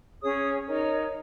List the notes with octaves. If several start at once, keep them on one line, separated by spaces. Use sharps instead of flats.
C#4 G#4 C#5 D#6
D#4 A#4 C#5